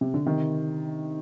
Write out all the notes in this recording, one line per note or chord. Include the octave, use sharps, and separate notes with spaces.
C3
D3
C3 D#3